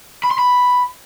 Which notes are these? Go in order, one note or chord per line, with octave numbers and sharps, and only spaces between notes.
B5
C6
B5